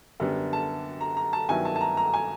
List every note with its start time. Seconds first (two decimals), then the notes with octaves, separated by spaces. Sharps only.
0.20 F#2 D3 G3 B3
0.53 A5
1.01 A#5
1.17 A#5
1.33 A5
1.49 G2 D#3 F#3 B3 E4 G#5
1.65 A5
1.76 A5
1.81 A#5
1.97 A#5
2.13 G#5